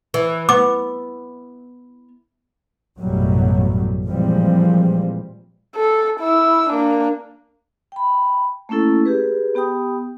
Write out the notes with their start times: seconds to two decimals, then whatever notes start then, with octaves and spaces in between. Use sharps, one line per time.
0.14 E3
0.49 B3 D6
3.00 A1 F#2 B2 F#3 G3 A3
4.07 A#2 E3 F3 G3 G#3 C4
5.76 A4
6.20 E4 E6
6.70 A#3 D4
7.92 G5 B5
8.69 A3 A#3 C#4 E4 A4
9.05 G4 G#4 B4
9.55 B3 G4 G5 D#6